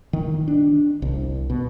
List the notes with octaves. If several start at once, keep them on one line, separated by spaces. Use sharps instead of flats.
D#3
D4
C2
B2